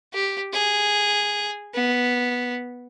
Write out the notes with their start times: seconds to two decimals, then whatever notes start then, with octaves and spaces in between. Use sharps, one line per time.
0.13 G4
0.53 G#4
1.74 B3